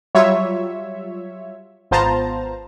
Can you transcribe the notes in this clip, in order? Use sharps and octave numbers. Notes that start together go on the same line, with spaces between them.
F#3 G3 F4 C#5 E5
G#1 B3 F4 C5 A5 A#5